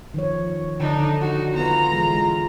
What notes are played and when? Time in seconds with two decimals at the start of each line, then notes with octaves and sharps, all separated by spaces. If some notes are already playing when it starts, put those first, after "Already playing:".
0.14 D#3 F3 C#5
0.80 D3 D4 D#4
1.21 D#4 F#4
1.55 B3 F4 B4 A#5
1.92 E3 G#3